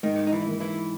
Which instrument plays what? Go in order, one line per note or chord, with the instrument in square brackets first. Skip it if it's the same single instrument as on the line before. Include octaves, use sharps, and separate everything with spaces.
[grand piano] G#2 [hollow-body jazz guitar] D#3 D#4
[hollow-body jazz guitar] D#4
E3 E4
[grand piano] D#3 A#3
[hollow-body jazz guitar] E3 E4